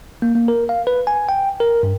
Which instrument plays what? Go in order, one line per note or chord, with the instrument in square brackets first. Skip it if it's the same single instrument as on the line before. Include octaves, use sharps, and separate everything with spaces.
[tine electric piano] A#3
A#3
A#4
F5
B4
G#5
G5
A#4
G2